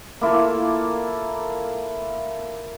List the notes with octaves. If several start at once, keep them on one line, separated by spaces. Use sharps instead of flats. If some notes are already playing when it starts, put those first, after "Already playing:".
A#3 E4 F4 A4